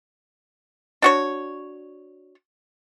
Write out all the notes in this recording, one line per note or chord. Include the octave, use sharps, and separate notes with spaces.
D4 F#4 C#5